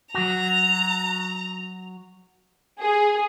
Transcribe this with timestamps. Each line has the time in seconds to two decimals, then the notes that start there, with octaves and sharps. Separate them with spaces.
0.15 F#3 F#4 A#5
2.80 G#4